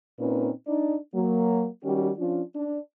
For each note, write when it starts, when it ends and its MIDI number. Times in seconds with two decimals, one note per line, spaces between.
0.20 0.50 46
0.20 0.50 60
0.20 0.50 61
0.20 0.50 63
0.20 0.50 71
0.67 0.96 62
0.67 0.96 63
0.67 0.96 74
1.14 1.66 54
1.14 1.66 58
1.84 2.11 51
1.84 2.11 55
1.84 2.11 61
1.84 2.11 66
1.84 2.11 67
2.18 2.42 53
2.18 2.42 61
2.18 2.42 62
2.18 2.42 65
2.56 2.78 62